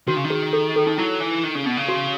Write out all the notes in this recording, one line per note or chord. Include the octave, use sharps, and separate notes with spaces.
D#3 F#4
C#3
D#3
G#4
A4
A4
D#4
F#3 E4
E3
D#3
C#3
B2
C#3
F#4